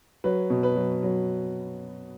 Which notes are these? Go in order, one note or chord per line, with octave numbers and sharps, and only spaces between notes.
F#3 B4
B2
B4
F#3
F#3